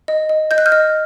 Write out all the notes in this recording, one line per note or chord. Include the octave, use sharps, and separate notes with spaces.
D#5
D#5
D#5 G6
F#6
F6 G6
D#5